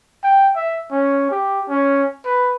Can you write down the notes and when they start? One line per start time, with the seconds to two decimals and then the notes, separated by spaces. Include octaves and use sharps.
0.24 G5
0.56 E5
0.91 C#4
1.31 G4
1.69 C#4
2.25 B4